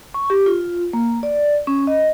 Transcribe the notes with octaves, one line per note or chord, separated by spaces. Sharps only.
C#6
G4
F4
A#3
D5
C#4
D#5